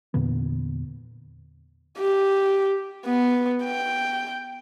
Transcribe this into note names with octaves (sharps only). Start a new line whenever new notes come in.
E2 A#2 D3 B3
G4
B3
G5